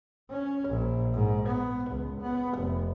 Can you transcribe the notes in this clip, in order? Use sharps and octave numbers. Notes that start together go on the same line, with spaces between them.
C#4
A#1
G#2
B3
C#2
B3
F1